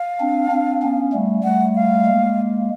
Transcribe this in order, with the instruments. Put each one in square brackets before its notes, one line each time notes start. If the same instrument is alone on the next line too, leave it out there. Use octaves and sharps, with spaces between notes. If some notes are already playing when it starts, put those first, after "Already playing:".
Already playing: [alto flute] F5
[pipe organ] C4 D4
C4 D4
B3 C#4
G3 A3
[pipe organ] G3 A3 [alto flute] F#5
[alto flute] F5
[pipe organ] G#3 A#3